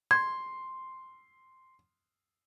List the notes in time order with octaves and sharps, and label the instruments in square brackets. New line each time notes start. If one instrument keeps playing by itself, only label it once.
[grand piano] C6 [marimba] G#6